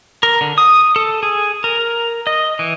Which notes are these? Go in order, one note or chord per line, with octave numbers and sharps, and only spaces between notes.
A#4
D3
D#6
A4
G#4
A#4
D#5
E3